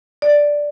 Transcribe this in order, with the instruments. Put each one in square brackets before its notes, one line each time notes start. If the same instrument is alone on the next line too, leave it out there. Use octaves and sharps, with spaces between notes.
[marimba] D5